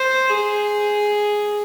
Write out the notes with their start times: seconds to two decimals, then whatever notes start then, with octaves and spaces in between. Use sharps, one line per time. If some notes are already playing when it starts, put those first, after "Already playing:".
Already playing: C5
0.30 G#4